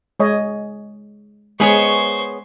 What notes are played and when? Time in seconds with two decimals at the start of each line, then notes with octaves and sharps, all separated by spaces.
0.20 G#3 C#5 D#5
1.60 G#3 B3 G#4 C5 C#5 C#6